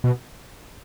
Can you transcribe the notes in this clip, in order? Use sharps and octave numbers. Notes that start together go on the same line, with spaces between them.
B2